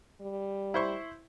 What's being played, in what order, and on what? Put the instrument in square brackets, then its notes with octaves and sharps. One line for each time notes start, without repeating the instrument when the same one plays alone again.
[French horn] G3
[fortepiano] E4 C5 C#6